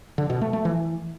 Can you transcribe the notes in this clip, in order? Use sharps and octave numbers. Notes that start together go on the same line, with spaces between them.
D3
B2
A3
A3
E3